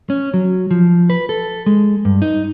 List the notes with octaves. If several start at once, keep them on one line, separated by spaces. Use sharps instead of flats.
C#4
F#3
F3
B4
A4
G#3
G2
D#4